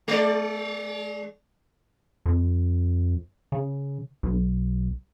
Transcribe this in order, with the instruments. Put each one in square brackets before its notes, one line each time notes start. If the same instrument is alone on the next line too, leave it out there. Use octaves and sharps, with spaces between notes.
[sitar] G#3 D5
[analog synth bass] F2
C#3
B1